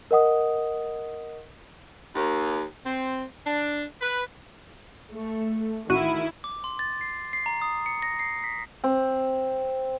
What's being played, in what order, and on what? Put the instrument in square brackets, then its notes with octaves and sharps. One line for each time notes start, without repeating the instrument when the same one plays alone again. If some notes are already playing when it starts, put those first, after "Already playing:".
[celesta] A#4 D#5 F#5 D#6
[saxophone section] D#2
C4
D4
B4
[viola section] A3
[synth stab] A1 F#4 D#7 [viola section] D#3 E4
[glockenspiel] D6
C6
A6
C7
C7
A#5
D#6
C#7
A#6
C7
B6
[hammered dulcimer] C4